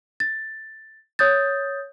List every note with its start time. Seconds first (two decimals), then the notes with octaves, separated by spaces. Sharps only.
0.20 A6
1.19 C#5 D#6 G6 A6